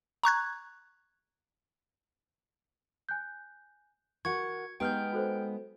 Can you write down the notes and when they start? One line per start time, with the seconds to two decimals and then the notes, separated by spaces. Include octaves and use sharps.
0.24 A#5 C#6 F#6 G#6
3.09 G#5 F#6 G6
4.25 F#4 A#4 F#5 C#6 G#6 C#7
4.80 G#3 B3 D#4 G4 G5 F6 G6
5.12 F#4 A4 C5